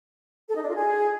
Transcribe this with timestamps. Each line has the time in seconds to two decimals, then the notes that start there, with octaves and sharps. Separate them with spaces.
0.49 A4
0.55 D#4
0.62 D4
0.68 F4
0.75 G#4